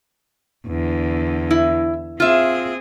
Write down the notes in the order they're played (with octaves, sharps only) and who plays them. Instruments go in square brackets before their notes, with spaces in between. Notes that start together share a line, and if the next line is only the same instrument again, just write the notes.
[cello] E2 D3
[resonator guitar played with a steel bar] E4
[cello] C4 G#4 [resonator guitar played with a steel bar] F4 E5